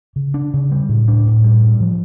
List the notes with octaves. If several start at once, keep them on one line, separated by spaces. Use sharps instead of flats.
C#3
D4
C#3
G3
A2
D4
A2
G3
G2
F3